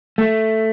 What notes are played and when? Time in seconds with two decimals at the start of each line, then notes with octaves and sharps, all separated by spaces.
0.18 A3